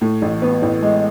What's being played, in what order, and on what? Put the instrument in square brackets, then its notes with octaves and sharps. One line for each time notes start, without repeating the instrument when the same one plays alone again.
[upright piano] A2
A1
B3
A1
G#3